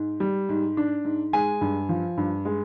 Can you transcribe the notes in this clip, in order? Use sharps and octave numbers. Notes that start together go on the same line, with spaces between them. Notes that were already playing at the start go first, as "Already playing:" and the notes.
Already playing: G#2
G3
G#2
D4
G#2
G#3 G#5
G2
F3
G2
G#3